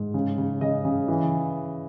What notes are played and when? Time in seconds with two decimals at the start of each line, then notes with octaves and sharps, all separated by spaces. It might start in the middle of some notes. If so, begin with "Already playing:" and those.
Already playing: G#2
0.14 C#3
0.38 C#3
0.61 C#3 D#5
0.85 C#3
1.08 E3